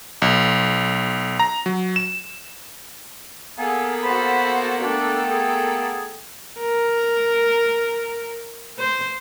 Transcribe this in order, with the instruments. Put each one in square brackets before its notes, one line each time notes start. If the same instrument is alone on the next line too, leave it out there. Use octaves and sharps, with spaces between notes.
[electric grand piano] B1
A#5
F#3
E7
[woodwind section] A#3 B3 A4 [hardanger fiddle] G#4
[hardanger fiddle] F#4 C5 [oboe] B5
[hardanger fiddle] A3 G5 [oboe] D4
[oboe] G#4
[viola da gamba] A#4
C5